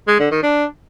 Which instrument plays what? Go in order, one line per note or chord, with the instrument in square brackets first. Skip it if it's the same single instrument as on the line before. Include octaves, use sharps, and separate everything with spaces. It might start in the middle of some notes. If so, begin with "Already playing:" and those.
[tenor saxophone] G#3
D3
D#3
D4